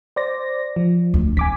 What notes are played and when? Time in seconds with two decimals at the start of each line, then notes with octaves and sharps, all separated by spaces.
0.16 C5 D5 A#6
0.76 F3
1.14 D2
1.37 C4 G#5 D6 B6